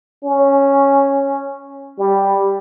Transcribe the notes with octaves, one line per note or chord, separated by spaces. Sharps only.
C#4
G3